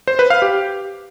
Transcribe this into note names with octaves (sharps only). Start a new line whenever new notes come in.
C5
B4
F5
G4